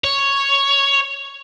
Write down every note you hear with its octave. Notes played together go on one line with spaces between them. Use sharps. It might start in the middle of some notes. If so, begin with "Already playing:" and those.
C#5